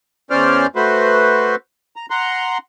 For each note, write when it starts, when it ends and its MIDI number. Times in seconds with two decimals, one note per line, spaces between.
0.31 0.67 40
0.31 0.67 61
0.31 0.67 72
0.31 0.67 74
0.31 0.67 89
0.76 1.55 57
0.76 1.55 66
0.76 1.55 71
0.76 1.55 72
1.96 2.06 82
2.10 2.58 78
2.10 2.58 82
2.10 2.58 84